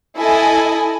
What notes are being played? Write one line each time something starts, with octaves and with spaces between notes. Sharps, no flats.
E4 A4 D#5 G#5